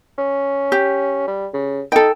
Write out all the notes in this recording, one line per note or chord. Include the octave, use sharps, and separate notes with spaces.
C#4
G4
G3
C#3
D#4 A4 G5